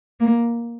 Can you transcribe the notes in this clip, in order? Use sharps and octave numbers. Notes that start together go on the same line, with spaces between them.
A#3